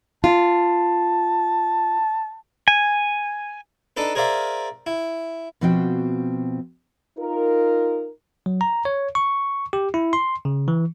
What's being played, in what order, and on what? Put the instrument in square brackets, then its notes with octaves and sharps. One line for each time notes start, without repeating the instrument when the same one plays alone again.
[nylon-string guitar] F4 [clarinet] A5
[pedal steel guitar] G#5
[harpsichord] D4 D#4 A4 B4
G#4 A#4 C5 D5 E5 F5
E4
[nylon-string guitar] B2 F3 C4 F#4 D5 G5
[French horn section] D#4 F4 A#4
[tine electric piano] F#3
A#5
C#5
C#6
G4
E4
C6
C#3
E3